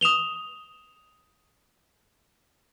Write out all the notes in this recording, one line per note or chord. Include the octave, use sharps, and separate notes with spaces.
D#6 E7 F7 G7